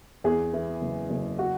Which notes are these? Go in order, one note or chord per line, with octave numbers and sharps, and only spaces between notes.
E2 G#4
E3
F#1
F#1
F#4